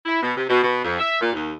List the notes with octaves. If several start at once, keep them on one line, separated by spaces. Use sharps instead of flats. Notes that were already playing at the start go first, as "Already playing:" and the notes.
E4
B2
C3
B2
B2
F2
E5
A#2
D#2